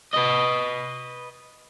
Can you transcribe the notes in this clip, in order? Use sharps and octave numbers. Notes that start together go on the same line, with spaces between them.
B4 D#5